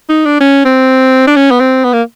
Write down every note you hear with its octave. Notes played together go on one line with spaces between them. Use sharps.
D#4
D4
C#4
C4
D4
C#4
B3
C4
B3
A#3